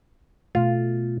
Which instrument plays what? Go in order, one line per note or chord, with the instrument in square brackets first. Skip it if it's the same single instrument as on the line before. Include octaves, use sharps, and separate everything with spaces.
[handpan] B2 A3 [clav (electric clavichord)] F4